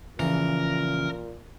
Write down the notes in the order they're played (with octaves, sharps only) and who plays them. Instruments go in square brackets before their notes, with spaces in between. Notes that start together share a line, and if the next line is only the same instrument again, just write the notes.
[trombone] A#2 [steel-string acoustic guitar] C#3 F3 [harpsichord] E3 [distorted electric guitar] A#4